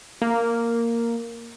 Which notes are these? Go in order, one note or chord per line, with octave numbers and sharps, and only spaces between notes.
A#3